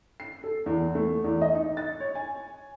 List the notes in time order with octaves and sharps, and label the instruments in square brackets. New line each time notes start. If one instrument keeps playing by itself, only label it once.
[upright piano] C7
A4
E2
A3
E2
D#5
D#4
A6
C#5
G#5